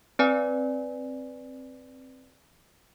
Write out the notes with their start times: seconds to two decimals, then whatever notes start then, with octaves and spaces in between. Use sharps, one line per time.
0.19 C4 B4 D5 G#5